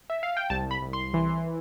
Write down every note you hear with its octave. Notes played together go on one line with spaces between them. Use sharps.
E5
F5
G5
C2 A5
B5
C2
C6
E3